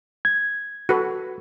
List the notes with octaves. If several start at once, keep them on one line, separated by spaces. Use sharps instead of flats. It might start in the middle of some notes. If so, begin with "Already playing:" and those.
G#6
F#4 A4 B4